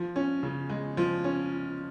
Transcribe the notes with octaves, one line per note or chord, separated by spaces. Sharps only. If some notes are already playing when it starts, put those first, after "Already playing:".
Already playing: F3
C#4
C#3
G#3
F3
C#4